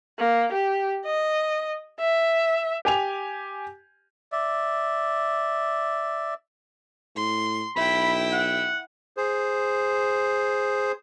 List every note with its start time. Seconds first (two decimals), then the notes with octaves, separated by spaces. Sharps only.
0.19 A#3
0.52 G4
1.06 D#5
2.00 E5
2.85 G4 G#5 F7
4.32 D5 E5
7.16 A2 C6
7.76 B1 E4 G5 B5
8.32 F#5
9.17 G#4 C5